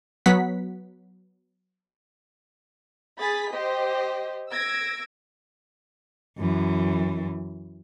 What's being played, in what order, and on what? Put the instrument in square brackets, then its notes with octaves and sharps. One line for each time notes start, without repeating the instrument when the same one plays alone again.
[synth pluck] F#3 B3 F#5 B6
[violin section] G#4 B5 A6 B6
G4 C5 D#5
E6 G#6 A#6 D7
[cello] F#2 E3